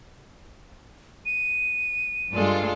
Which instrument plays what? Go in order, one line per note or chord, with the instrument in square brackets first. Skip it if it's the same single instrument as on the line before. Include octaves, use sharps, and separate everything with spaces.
[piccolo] D#7
[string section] G2 F4 [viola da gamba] G#3 A4 D5